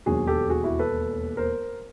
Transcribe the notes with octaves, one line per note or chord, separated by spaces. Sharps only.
E1 D#2 D3 F#3 F#4 G#4
G4 A4
F#4 G#4
E4 F#4
A4 B4
A#4 C5